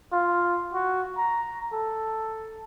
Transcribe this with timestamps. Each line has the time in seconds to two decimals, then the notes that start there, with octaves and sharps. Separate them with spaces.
0.12 F4
0.74 F#4
1.17 A#5
1.73 A4